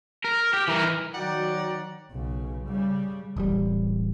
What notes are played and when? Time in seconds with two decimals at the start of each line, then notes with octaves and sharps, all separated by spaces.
0.25 A#4
0.54 G4
0.68 E3 A#4
1.14 D#3 F#3 F#4 D5 F#5 G5 A#5
2.11 B1 C#3
2.66 C#3 G3
3.37 D1 A1 G3